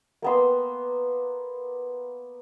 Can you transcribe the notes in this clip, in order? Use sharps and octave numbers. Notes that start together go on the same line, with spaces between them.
A#3 B3 C6